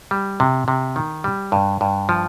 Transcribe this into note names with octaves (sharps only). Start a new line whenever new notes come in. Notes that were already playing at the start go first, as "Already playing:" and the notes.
G3
C3
C3
D#3
G3
G2
G2
F3